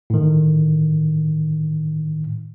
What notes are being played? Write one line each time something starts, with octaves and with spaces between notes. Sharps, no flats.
A2 D#3